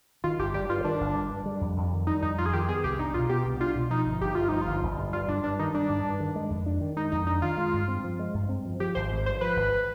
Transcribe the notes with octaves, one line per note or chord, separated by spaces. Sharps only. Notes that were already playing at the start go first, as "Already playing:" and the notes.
D#3 F4
G1 G4
G3 G4
G2 F4
D#3 D4
G1
G3
G2
G3
F2
F2
D#3
G3 D#4
F2 D#4
F2 F4
G#4
D#3 G4
B3 G#4
C2 G4
D4 D#4
B2 F4
B3 G4
C2
D4 F4
B2
F3 D#4
G1
G1 G4
G2 F4
F3 D#4
F4
G1
G1
G2
G3 F4
G2 D4
G2 D4
D#3 D#4
G3 D4
G2
G2
D#3
G#3
F2
D4
D#3
G#3 D#4
F2 D#4
D4 D#4
D#3 F4
G#3
G2
C4
F3
G#3
G2
C4
F3
F3 G4
G#1 C5
G#1
G2 C5
F3 B4
G#1